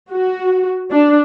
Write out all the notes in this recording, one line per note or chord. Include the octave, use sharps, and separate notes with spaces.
F#4
D4